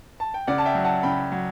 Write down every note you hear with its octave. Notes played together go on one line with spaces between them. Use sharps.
A5
G5
C#3 D5 F#5
A5
E5 G5
F#3
F#5 A5
C#3 G5 B5
F#3